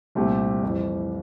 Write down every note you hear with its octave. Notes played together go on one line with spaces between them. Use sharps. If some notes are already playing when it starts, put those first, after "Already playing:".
C2 A#2 A3 C4 G4
F2 E3 G3